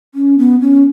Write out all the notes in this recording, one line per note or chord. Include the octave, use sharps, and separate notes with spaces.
C#4
B3
C#4